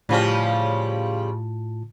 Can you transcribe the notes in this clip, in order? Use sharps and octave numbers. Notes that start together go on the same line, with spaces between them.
A2 C#3 F3 G3 F4 A5